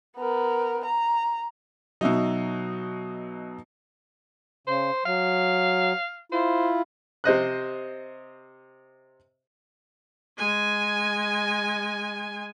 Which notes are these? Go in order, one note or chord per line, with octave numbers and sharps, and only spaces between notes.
B3 A#4
A#5
B2 F#3 D#4 E5 E6
C#3 C5
F#3 F5
E4 F4 C5
C3 C5 D#5 F#6
G#3 G#5